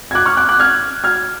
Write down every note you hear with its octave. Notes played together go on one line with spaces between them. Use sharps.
G#6
D6 F#6
C#6 F6
D6 F#6
D6 F#6
F6 G#6
F6 G#6